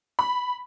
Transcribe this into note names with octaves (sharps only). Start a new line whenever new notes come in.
B5